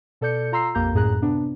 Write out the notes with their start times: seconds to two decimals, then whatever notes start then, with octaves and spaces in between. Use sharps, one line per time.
0.21 B2 A4 D5 G6 C#7
0.52 F4 A#5 C6 E6 C7
0.75 A#1 F2 A#3 G4 A#5 G6
0.94 F#2 A2 G#4 A#5 F#6
1.22 C3 B3 D4